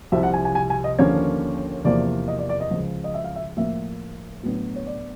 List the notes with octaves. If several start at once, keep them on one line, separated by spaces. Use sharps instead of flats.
C2 C3 F3 E5
F#5
G#5
G#5
G#5
G#5
D#5
D#2 D3 F3 A#3 C#4 C#5
E2 C3 F3 A#3 D5
D#5
D5
D5
D#5
C#2 C#3 F3
D#5
E5
F5
E5
A2 F3 A#3 E5
A2 F#3 B3 D4
C#5
D5